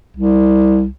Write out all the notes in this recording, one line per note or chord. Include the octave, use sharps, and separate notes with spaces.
C2